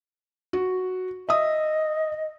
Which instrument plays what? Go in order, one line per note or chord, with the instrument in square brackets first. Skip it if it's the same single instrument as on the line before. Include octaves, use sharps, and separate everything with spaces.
[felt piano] F#4
[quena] D#5 [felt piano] E5 D#6